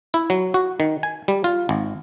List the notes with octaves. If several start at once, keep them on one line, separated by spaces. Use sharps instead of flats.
E4
F#3
F#4
D#3
G#5
G3
F4
G#1